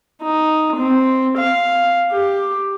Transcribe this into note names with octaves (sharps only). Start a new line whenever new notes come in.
D#4
C4
F5
G4